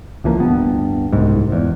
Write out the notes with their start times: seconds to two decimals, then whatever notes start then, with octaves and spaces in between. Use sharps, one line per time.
0.24 C#2 E3 F3 A#3
0.38 D1 G2 B3
1.13 F#1 C2 G#2
1.52 E2